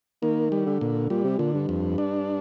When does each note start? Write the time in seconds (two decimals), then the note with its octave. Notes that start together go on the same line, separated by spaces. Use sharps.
0.22 D#3 A#3
0.52 G3
0.66 D3
0.81 A#2
1.10 A#2 G3
1.24 C3
1.38 A#2 D3
1.54 G2
1.69 F2
1.98 D4